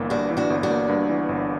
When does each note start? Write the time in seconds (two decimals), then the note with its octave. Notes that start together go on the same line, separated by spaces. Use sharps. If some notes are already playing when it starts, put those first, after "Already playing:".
Already playing: G1 G2 E3 A#3
0.10 G2 D4 F#4
0.30 E3
0.37 D4 F#4
0.50 G1
0.63 D4 F#4
0.70 A#3
0.89 G2
1.09 E3
1.29 G1